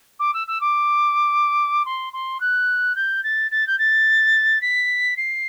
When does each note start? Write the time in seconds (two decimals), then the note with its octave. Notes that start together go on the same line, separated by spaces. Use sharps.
0.19 D6
0.33 E6
0.47 E6
0.61 D6
1.85 C6
2.13 C6
2.40 F#6
2.95 G6
3.23 A6
3.51 A6
3.67 G6
3.78 A6
4.61 B6
5.17 C7